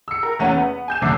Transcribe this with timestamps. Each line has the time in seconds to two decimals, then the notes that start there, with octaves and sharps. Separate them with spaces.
0.08 E6 C#7
0.23 A#4
0.39 E2 A3 C#4 F#5 A#5 D#7
0.54 B3
0.88 G#5 G6 E7
1.02 F#1 E2 D3 A3 D6 C7